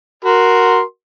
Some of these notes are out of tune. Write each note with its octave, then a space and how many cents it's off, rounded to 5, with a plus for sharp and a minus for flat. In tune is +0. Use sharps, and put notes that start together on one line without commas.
F#4 +0 A#4 +0 C6 +0